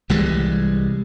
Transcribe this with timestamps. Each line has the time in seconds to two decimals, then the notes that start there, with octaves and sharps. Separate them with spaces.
0.09 C2 E3 G3 G#3